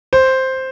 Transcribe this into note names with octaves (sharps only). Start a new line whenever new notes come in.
C5